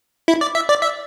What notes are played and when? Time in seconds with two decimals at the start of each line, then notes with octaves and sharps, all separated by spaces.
0.28 E4
0.41 D5
0.55 E5
0.69 D5
0.82 E5